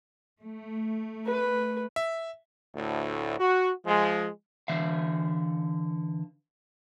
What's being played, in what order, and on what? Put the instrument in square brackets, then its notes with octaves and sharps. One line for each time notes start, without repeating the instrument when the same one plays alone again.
[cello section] A3
[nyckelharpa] B4
[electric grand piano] E5
[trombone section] D2 A2
F#4
F3 G#3
[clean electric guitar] D3 E3 E5 F5